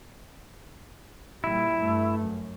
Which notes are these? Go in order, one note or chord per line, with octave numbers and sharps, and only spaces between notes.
A#2 G3 E4
G2 A3
F#2